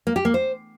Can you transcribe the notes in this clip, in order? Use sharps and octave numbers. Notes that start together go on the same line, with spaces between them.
A#3
G4
A#3
C5